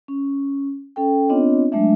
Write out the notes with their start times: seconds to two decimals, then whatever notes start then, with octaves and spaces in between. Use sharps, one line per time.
0.08 C#4
0.96 C#4 A4 G5
1.29 B3 C4 D4 F4 C#5 D#5
1.72 F#3 G#3 A3 D4 E5